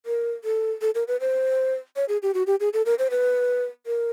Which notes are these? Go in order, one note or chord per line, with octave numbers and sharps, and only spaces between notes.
A#4
A4
A4
A#4
B4
C5
C#5
G#4
G4
F#4
G4
G#4
A4
A#4
C5
B4
A#4